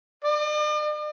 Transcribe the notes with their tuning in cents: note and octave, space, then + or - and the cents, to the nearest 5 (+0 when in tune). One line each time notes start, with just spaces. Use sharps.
D5 +45